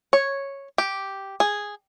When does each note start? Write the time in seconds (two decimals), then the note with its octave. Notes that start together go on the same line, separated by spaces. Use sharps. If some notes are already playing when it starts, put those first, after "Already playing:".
0.13 C#5
0.78 G4
1.40 G#4